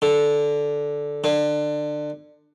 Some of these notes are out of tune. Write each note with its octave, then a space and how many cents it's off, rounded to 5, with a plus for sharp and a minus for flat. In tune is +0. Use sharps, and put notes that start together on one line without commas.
D3 -10
D3 +25